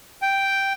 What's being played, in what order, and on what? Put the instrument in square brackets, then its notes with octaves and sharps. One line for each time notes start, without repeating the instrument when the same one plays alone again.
[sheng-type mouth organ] G5